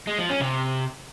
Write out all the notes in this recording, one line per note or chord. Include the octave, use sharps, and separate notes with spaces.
G#3
F3
C#4
C3